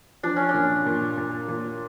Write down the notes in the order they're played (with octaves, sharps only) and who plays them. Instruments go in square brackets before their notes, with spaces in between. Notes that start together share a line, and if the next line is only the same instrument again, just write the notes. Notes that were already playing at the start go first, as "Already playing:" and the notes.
[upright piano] F3 [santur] D4
[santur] C#4
D4
[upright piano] A#2
A#2
A#2
A#2